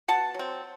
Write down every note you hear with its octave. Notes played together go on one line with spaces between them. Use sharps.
B2 F#5 A5
F#3 C4